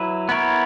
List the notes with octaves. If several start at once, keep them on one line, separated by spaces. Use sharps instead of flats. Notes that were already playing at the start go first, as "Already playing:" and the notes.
Already playing: F#3 E4 B4
B3 E4 A#4 C#5